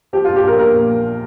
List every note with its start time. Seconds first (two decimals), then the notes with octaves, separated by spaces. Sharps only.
0.13 F3 G4
0.25 A#1 F4
0.36 G4
0.44 A#1 A#4
0.59 A#2 A#4
0.74 A#2
0.89 A#2